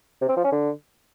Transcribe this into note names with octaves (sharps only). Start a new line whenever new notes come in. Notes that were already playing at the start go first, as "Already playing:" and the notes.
C3
C4
F3
C#4
D3